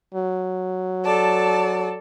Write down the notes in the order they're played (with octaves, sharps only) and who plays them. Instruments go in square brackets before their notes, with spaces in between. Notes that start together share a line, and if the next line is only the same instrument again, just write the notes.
[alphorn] F#3
[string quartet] A4 D5 A5